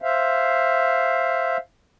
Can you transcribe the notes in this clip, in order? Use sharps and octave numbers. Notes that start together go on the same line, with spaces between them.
C5 E5 F5